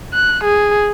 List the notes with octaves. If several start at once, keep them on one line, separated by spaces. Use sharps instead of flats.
F#6
G#4